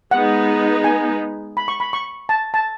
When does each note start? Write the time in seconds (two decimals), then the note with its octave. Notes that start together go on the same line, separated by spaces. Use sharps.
0.11 G#3 B3 D#4 F#5
0.84 G#5
1.57 B5
1.68 C#6
1.80 B5
1.93 C#6
2.29 A5
2.54 A5